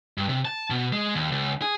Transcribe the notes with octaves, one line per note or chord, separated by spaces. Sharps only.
G2
C3
A5
B2
G#3
D#2
C#2
G#4